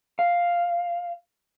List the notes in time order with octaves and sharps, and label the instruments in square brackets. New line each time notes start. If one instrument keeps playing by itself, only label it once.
[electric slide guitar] F5